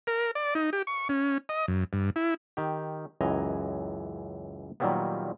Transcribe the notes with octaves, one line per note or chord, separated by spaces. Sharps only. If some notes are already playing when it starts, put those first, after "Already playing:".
A#4
D5
D#4
G4
C#6
C#4
D#5
F#2
G2
E4
D#3 G4
C#2 F#2 E3 D#5 G#5 A#5
A#2 D#3 F#3 G3 A#3 B3